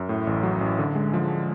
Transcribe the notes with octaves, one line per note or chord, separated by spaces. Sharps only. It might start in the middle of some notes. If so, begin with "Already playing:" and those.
Already playing: F#2
A2
A1
F#3
A1
D3
G#3
F3